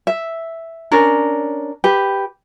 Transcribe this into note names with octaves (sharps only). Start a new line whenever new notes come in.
E5
C#4 D4 A#4
G4 B4